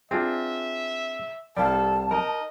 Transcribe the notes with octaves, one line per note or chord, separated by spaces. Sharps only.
C4 D4 F4 G#4 E5
C2 G3 A4 D5 F5 A5
D#4 A#4 D#5